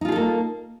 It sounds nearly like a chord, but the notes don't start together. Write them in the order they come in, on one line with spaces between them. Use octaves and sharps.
D#4 F4 G#4 A4 A#3